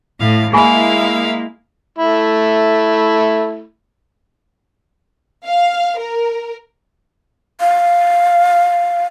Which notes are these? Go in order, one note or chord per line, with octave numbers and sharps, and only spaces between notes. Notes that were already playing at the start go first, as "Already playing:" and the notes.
A2 F5
G#3 A#3 E4 G#4 E5 F5 G#5 B5
A3 E4
F5
A#4
F5